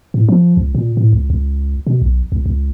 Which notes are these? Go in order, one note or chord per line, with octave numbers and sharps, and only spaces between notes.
A2
F3
C#2
A#2
A2
C#2
C#2
B2
B1
C#2
C#2